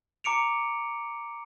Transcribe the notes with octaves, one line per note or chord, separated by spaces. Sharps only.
A#5 D6 C#7 D7 F7